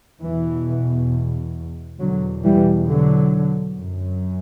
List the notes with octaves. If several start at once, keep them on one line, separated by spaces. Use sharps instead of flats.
E2 B2 E3
E2 B2 D3 F#3
E3 G3
D3 F#3
F#2